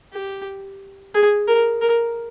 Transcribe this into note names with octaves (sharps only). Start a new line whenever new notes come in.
G4
G#4
A#4
A#4